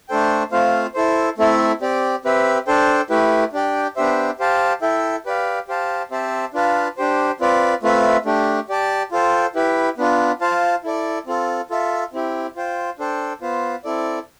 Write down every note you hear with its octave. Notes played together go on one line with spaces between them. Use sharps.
A3 D4 A4 C5 G5
A3 C4 F4 C5 F5
E4 A4 C5
A3 C4 E4 A4 E5
C4 G4 D5
C4 G4 B4 E5
D4 A4 C5 G5
A3 E4 G4 B4
D4 G4 D5 G5
B3 D4 G4 C5 E5
G4 C5 F5 A5
E4 A4 E5 G5
G4 B4 D5 F5
G4 C5 F5 A5
C4 G4 C5 E5 A5
D4 F4 B4 F5 A5
D4 G4 C5
C4 F4 B4 D5
A3 C4 F4 B4 E5
A3 D4 G4
G4 D5 A5
F4 A4 C5 G5
E4 G4 B4
B3 D4 F4
F4 C5 F5 A5
E4 A4 D5
C4 F4 A4
F4 A4 E5
C4 E4 G4
F4 C5 G5
D4 A4 C5 G5
B3 F4 C5
C4 E4 A4 D5